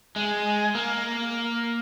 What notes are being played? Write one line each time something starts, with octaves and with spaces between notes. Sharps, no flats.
G#3
A#3